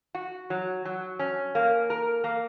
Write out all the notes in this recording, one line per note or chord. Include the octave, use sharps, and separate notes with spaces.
F#4
F#3
F#3
C#4
A#3
A#4
A#3